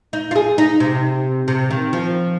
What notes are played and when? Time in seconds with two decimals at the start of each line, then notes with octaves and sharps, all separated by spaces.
0.13 D#4
0.31 F4
0.36 G#4
0.58 D#4
0.80 C3
1.48 C3
1.71 D#3
1.93 F3